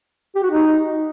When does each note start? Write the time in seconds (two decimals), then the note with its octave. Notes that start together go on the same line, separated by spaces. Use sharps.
0.36 G4
0.43 F#4
0.50 D#4